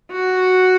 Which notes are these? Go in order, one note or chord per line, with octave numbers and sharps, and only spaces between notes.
F#4